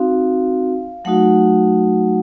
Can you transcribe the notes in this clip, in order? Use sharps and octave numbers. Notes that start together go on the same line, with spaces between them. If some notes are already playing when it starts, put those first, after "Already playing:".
Already playing: C4 D#4 F#4 F5
F#3 A3 D#4 F#4 F#5